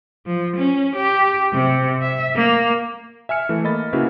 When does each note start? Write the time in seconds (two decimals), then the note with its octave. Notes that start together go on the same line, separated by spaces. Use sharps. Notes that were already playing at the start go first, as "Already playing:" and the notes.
0.26 F3
0.56 C#4
0.96 G4
1.53 C3
2.02 E5
2.36 A#3
3.29 E5 G#5 F6 C#7
3.49 E3 A3
3.64 A#3 D#5 B5 A6
3.93 C#3 A#3 C#4 E4 F#4 B4